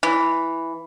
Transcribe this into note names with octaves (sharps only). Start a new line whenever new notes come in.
E3